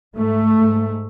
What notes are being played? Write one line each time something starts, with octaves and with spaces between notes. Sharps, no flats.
G#2 A3
G#2